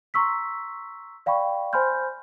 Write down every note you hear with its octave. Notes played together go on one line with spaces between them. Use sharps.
A#5 C6 C#6 E6 B6
D5 F5 G5 B5 C#6
C5 G#5 B5 C6 F6 G6